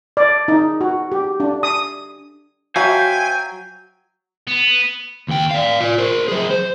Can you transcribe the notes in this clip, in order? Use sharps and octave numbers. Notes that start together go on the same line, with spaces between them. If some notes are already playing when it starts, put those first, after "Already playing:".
D5
D#4
F#4
G4
D4
D#6
F#3 C5 E5 F5 G5 G#5
B3
D#2 G5
D5 F5
F4 D5
A#4 C5
F#3 G#4
C5